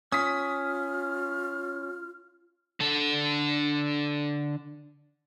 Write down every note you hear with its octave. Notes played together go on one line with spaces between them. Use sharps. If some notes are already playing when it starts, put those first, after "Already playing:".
C#4 F4 D#6 F6 B6
D3 A4